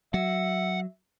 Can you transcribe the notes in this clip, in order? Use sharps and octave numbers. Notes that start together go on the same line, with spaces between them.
F#3 E5 F#5